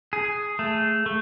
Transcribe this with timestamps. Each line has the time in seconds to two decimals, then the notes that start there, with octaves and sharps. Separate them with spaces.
0.13 G#4
0.59 A3
1.06 A3